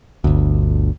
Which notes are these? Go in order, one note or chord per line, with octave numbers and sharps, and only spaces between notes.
G1 D2